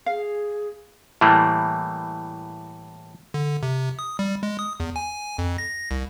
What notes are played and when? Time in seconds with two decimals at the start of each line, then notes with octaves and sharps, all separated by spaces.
0.06 G#4 F5
1.21 A2 E3 G3 A3 A#3
3.34 D3
3.63 C3
3.99 D#6
4.19 G3
4.43 G#3
4.59 D#6
4.80 E2
4.96 G#5
5.38 F2
5.58 A#6
5.91 C2